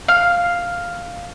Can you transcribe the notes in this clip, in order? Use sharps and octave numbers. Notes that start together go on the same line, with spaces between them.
F5